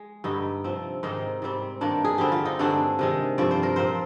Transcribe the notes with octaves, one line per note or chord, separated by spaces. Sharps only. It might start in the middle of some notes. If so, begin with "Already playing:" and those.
Already playing: G#3
G2 D3 G3 D#4
C3 F3 C4
G#2 D#3 G#3 C4 D#4
G#2 G3 C4
G2 D#3 A#3 D4
G#4
D3 G3 C4 G4
F4
D#4
G2 D3 G#3 C4 D4
C3 D#3 G#3
G2 F3 C4 D5
C5
A#4
A#2 F3 C4 C5